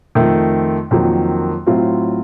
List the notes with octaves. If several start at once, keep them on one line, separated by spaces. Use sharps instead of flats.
F2 D#3 A3
F2 D#3 F#3 A#3
A2 F#3 C4 F4